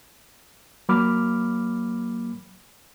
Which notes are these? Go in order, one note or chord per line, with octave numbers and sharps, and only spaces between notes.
F#3 A#3 B5 D6 F6